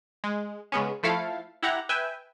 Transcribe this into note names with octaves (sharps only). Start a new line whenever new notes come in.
G#3
C#3 G#3 B3 C#4
F3 A3 E4 A4 F5
E4 G4 F#5 A#5
B4 E5 G5 G#5